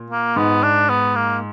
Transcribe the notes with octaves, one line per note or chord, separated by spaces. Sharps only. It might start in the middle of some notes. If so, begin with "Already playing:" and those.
Already playing: A#2
A#3
G#2 B3
D4
B3
A#3